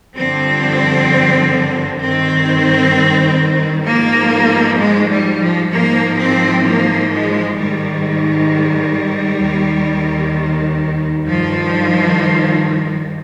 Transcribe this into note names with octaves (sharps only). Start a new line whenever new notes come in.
G2 D3 F3 C4
G2 D#3 C4
G#2 F3 A#3
G#3
G3
F3
G#2 F3 A#3
C4
A#3
G#3
G#2 D#3 G3
D#2 D#3
G2 D#3 F3